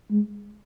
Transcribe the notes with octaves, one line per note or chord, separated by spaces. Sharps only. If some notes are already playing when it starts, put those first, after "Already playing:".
G#3